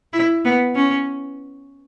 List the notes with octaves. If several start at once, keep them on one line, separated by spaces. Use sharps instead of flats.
E4
B3
C#4